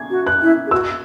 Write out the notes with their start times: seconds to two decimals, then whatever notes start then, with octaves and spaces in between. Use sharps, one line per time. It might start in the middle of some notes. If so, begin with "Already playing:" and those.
Already playing: G#6
0.10 F#4
0.27 F#6
0.42 E4
0.67 G#4
0.71 F#4 E6